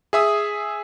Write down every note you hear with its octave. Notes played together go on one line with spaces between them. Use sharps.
G#4 E5 D#6